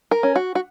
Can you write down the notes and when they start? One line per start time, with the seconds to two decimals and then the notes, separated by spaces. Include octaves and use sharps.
0.11 A#4
0.23 C#4
0.36 F#4
0.55 F#4